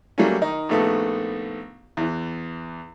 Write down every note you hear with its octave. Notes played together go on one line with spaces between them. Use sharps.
F#3 G3 A3 A#3 C#4
D#3 D#4
A#1 D#3 A3 B3 A4
E2 E3